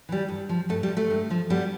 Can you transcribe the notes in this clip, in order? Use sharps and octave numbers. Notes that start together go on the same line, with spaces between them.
E3 G3
G2
F3
G2 A3
G3
F3
A3
G2
F3
G2 G3 B3